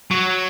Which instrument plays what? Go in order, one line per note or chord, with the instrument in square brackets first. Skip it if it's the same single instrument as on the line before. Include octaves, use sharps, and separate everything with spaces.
[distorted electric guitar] F#3